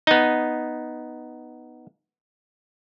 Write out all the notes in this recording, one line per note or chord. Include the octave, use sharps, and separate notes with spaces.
B3 D#4